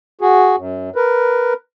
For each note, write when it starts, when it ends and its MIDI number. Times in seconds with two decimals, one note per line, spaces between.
0.21 0.56 66
0.21 0.56 68
0.57 0.90 42
0.96 1.53 70
0.96 1.53 71